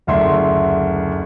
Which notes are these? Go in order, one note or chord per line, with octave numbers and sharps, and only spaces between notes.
F#1 D2 E5 C6